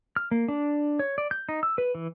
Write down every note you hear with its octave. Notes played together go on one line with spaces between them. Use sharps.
F6
A#3
D4
C#5
D5
G6
D#4
E6
B4
E3